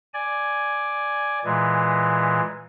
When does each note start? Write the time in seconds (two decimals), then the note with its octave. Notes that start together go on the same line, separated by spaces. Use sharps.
0.14 D5 G#5
1.45 A#2 E3 G#3